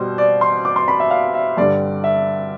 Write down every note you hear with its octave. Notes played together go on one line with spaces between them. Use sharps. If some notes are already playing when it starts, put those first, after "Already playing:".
Already playing: B2 G3 C5
D5
C6
D6
C6
B5
E5
F5
E5
G2 D3 G3 D5
E5